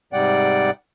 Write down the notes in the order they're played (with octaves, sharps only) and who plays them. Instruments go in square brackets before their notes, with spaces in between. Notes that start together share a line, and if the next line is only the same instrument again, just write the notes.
[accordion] G#2 C3 G3 D5 F#5 G5